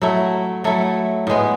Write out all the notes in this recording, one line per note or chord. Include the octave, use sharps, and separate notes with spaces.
F#3 A3 E4
F#3 A3 E4
A2 G#3 B3